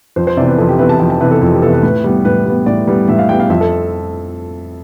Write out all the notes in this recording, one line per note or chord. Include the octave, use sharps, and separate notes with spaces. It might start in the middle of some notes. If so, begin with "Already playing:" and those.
F2 C5
C5
C3 E3 B3 D5
B4
F2 A4
G4
C3 E3 B3 B4
A5
F2 G5
A5
C3 E3 B3 B4
A4
F2
G4
C3 E3 B3 A4
B4
A2 B4
G3 B3
A2 B4
G3 B3
A2 D5
G3 B3
A2 E5
F5
G3 B3 G5
F5
F2 E5
A4